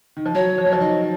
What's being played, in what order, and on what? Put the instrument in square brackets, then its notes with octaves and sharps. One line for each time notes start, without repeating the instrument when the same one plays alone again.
[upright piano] D#3
F3
[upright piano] F#3 [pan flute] C#5
[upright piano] F3
F#3
F3
[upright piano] D#3 [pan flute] D#5